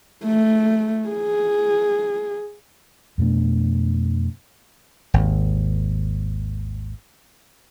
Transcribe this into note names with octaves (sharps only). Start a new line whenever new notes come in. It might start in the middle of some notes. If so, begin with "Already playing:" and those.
A3
G#4
F2 B2 A3 D4
G#1 D#2